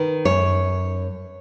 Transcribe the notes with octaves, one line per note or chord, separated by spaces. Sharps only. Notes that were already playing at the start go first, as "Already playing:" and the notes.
Already playing: D#3 B4
F#2 C#5